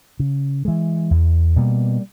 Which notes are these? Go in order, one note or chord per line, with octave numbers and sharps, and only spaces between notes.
C#3
E3 G#3
E2
B2 G3 A#3